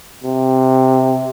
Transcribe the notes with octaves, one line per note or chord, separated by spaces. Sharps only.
C3